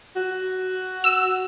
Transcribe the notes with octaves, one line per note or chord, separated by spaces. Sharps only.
F#4
E6